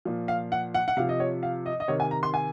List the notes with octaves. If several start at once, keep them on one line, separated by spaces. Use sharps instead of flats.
A#2 F3
F5
F#5
F#5
F#5
C3 F3 F5
D#5
C#5
F5
D#5
D#5
C3 D#3 C#5
G#5
A#5
C6
G#5